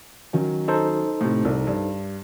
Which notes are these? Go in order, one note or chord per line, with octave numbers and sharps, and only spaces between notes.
D#3 F#3 C#4
D#4 A4 C5
A2 C3
C2
G2